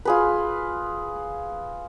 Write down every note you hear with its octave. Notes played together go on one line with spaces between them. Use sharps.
F4 G#4 B4